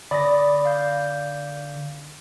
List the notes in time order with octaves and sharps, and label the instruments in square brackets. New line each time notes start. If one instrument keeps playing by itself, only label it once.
[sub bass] D3 [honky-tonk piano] D5 [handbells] B5 D#6 A#6
[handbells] F5 G6